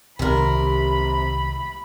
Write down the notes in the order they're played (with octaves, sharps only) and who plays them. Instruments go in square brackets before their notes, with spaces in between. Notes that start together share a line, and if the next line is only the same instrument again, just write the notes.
[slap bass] C2 D#3 [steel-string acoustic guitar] C3 A#4 [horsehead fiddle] B5